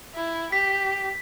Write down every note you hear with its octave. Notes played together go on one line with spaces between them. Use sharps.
E4
G4 B6